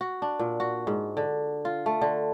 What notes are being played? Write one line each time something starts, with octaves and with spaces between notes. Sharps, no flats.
F#4
D4
A#2
F#4
G#2
D3
F4
A3
D3